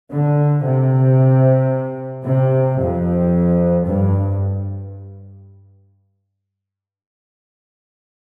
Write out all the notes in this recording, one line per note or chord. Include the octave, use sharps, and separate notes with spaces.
D3
C3
C3
F2
G2